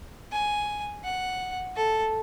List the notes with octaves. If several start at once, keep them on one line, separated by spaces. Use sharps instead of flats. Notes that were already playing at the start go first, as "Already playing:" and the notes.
G#5
F#5
A4